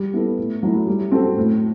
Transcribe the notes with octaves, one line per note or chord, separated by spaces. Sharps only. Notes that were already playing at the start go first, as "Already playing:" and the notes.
Already playing: G3
B3 E4 A4
A2
F#3 A3 E4
G3
C4 F#4 A4
A2